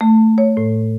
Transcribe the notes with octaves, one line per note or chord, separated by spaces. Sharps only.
A3
C#5
A2